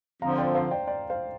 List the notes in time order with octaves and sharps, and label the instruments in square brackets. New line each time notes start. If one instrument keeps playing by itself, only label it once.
[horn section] D3 F3 C4 [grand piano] F5 A#5
[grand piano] D5 G5
C5 F5
D5 G5
D5 G5
C5 F5